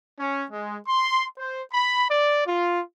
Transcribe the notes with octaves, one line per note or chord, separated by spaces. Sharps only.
C#4
G#3
C6
C5
B5
D5
F4